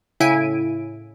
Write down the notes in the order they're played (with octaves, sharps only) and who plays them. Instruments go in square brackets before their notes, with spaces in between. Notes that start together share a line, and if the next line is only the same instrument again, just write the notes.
[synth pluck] A2 C#3 E4 G#5 D7 D#7